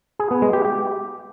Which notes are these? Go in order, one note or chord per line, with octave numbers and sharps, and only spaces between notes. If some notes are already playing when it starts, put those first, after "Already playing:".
G#4
B3
G#3
G4
G4